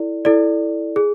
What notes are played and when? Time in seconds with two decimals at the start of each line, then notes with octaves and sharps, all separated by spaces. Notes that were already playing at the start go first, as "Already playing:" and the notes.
Already playing: E4 A4 D5
0.25 E4 A4 D5
0.96 G#4